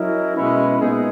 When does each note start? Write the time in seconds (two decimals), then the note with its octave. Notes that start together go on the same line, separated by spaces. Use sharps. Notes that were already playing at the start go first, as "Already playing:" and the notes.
Already playing: F#3 C#4 E4 A#4 D#5
0.36 B2 G#3 C#4 E4 B4
0.78 A#2 G#3 B3 D#4 G#4